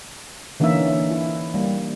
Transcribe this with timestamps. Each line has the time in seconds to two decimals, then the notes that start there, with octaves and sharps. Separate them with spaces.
0.60 D3 E3 A#3 C#4 D#4 E5
1.11 E4
1.54 G3 A#3